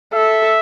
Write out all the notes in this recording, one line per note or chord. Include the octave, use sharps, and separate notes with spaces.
A4 E5